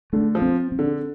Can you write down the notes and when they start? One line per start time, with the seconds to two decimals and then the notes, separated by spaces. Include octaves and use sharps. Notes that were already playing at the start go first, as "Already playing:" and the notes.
0.13 D3 A3
0.35 F3
0.42 C4
0.72 C4
0.79 D3